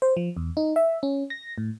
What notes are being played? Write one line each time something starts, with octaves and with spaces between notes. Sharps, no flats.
C5
F3
E2
D#4
E5
C#4
A#6
A2